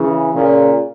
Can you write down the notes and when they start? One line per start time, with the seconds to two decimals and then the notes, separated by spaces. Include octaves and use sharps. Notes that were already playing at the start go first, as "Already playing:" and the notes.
Already playing: C#3 E3
0.33 A#2 C#3